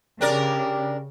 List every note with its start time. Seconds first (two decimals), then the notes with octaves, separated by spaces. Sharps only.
0.21 C#3 D4 G4 A#4 D5